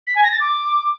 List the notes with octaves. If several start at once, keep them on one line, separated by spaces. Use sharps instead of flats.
B6
G#5
A#6
A6
D6